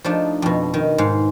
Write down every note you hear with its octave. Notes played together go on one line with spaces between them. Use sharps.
F3 A3 D4 D#4
F2 B2
D#3
G#2 F5